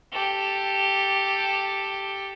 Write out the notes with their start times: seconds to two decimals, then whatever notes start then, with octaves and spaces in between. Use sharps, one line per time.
0.12 G4 A4